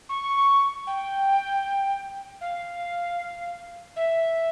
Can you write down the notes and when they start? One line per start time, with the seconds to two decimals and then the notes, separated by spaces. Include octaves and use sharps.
0.09 C#6
0.87 G5
2.41 F5
3.96 E5